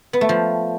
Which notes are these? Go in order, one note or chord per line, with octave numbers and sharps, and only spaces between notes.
B3
A3
F3